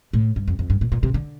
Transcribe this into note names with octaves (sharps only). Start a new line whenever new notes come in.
A2
G2
F2
F2
G2
A#2
A#2
C3
D3